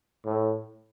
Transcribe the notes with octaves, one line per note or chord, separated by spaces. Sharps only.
A2